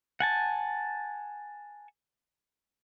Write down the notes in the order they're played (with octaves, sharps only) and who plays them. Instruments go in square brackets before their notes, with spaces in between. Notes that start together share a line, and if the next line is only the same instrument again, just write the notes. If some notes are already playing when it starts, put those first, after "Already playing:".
[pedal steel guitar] F#5 G#5 A5